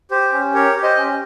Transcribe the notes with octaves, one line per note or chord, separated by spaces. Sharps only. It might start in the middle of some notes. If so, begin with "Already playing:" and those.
G4 C5
C#4
G4 A#4 C#5
G4
C5 D#5
C#4